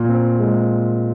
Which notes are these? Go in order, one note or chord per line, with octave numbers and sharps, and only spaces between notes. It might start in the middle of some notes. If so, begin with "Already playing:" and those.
Already playing: A#2
C4
G#3